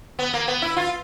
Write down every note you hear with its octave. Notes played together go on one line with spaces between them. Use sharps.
B3
A#3
B3
E4
F4